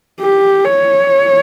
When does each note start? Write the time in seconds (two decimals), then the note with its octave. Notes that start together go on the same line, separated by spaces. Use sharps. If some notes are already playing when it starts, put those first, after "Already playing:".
0.21 G4
0.65 C#5